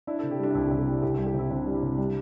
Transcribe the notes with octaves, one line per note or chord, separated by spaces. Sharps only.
D4 E4
A4
C3
G4
G3 D4
D4
C2 E4
G4
C3
G4
G3
C2 G4
E4
G3
G4
C3 E4
C3 D4
G3
E4
C3
G3 D4